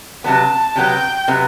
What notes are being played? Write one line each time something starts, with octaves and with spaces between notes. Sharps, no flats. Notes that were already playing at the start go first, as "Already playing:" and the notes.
C3 F#3 B3 A5
C3 F#3 B3 G5
C3 F#3 B3